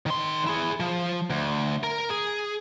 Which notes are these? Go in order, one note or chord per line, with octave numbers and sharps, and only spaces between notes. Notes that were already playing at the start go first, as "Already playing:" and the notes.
D#3 C6
E4 G#4
F3
D2
A#4
G#4